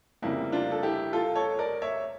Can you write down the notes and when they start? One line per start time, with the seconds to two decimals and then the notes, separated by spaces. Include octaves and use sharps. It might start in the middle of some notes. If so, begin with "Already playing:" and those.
0.22 F1 F2 C#3 G3 A#3 E4
0.52 D4 F4
0.71 A4
0.83 E4 G4
1.13 F4 A4
1.35 A4 C#5
1.59 A#4 D5
1.82 C#5 E5